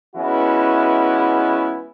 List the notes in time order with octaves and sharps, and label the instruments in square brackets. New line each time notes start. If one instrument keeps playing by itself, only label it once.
[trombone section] E3 G#3 B3 C#4 E4 F#4